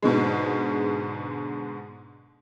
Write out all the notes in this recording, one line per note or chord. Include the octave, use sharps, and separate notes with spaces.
G#2 B2 D3 G#3